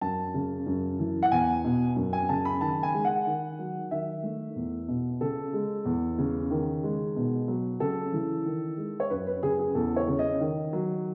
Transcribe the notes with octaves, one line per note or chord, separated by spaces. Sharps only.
F#2 A5
C#3
F#2
E3
F#5
E2 G#5
B2
F#2
G#5
C#3 A5
B5
D#3 A5
G#5
G#3
F#5
D#3
F#3
D#3 E5
A3
E2
B2
C#3 A4
G#3
E2
C#3
D#3
G#3
B2
F#3
C#3 A4
E3
D#3
G#3
C#5
F#2 B4
B4
C#3 G#4
G#4
E2 A4
C#5
C#3
D#5
D#3
F#3